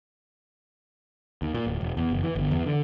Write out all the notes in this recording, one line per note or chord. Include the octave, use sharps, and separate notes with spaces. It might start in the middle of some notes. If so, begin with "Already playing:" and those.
D#2
A#2
D1
E1
E2
F#1
E3
G1
E2
D3